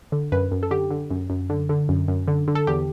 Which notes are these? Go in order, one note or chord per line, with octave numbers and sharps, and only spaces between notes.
D3
F#2 B4
F#2
A4
D3 G4
D3
F#2
F#2
D3
D3
F#2
F#2
D3
D3
A4
E2 G4